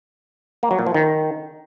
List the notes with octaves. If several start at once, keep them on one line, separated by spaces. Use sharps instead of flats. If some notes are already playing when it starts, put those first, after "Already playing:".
A#3
F#3
A#2
F3
D#3